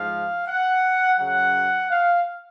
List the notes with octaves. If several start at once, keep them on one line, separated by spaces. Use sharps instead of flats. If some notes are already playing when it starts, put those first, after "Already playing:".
Already playing: G#2 F3 F5
F#5
F#2 C#3 F#3 F#5
F5